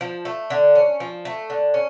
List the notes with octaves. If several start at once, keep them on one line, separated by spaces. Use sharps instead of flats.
F3
A3
D3
C#4
F3
A3
D3
C#4